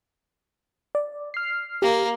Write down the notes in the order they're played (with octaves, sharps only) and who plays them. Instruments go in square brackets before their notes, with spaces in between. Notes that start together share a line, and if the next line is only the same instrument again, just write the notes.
[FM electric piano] D5
F6 C7
[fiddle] A#3 [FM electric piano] G4